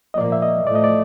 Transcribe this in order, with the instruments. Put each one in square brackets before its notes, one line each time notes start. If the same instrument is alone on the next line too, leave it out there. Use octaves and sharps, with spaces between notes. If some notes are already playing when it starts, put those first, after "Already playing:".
[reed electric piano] D#5
[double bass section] A#2 F3 A#3 [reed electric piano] D5
[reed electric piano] E5
D#5
[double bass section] A2 F3 A3 [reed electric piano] D5
[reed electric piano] D#5
D5